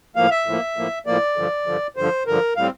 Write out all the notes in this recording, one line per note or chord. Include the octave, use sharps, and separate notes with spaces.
A2 F3 A#3 F5
E5
A2 F3 A#3
A2 F3 A#3
A2 F3 A#3 D5
G2 D3 F3
G2 D3 F3
G2 D3 F3 C5
G2 D3 F3 A#4
A2 G3 C4 F5